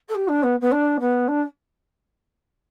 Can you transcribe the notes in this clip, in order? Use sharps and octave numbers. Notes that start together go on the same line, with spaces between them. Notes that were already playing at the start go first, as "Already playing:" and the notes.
A4
G4
D4
B3
B3
D4
B3
D4